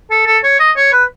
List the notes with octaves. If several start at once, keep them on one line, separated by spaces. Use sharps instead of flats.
A4
A4
C#5
D#5
C#5
B4